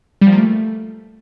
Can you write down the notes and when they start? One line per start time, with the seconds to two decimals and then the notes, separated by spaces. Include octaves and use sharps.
0.21 G3
0.27 F3
0.32 A#3
0.38 A3